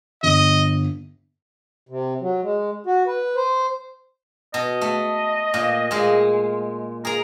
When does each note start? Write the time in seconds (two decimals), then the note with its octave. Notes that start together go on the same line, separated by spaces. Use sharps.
0.23 G1 D#5
1.89 C3
2.21 F#3
2.43 G#3
2.86 F#4
3.07 B4
3.36 C5
4.54 B2 D#5
4.81 A3
5.54 A#2
5.91 A#2 G#3
7.05 G#4 A#4 A#5